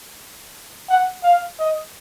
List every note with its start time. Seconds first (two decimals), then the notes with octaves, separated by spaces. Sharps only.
0.89 F#5
1.23 F5
1.59 D#5